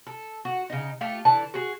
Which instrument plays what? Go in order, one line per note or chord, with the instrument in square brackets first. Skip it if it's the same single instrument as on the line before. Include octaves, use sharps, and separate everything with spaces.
[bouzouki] A4
F#4
C#3 D#4
A3 F4 G4 A4
D3 E3 A5
F#4 G#4